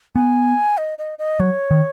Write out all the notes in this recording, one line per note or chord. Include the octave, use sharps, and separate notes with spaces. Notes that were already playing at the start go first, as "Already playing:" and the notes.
B3 G#5
D#5
D#5
D#5
F#3 C#5
D#3